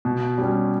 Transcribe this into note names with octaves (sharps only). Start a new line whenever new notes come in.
B2
G3 C#4